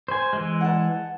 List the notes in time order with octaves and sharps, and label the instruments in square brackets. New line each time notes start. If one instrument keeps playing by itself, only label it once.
[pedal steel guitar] C5 G#5
E3 G#3
[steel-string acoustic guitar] F#5 A5